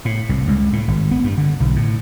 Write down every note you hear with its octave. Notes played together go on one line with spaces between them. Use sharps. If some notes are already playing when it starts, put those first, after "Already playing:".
A2
C2
C#2
A2
G#1
B3
G2
D3
B1
A2